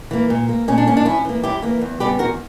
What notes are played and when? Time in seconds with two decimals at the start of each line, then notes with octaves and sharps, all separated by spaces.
0.11 E3 A#3
0.30 A#2
0.49 A#3
0.68 A#2 C#4
0.78 D4
0.87 A#3 C#4
0.97 D4
1.05 F#2 C#4 E4
1.25 E3 A#3
1.43 F#2 E4 G4
1.62 E3 A#3
1.81 E2
2.00 C#3 G3 B3 G4 B4
2.19 E2 F#4 A#4